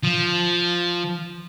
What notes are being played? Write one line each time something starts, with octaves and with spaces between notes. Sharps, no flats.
F3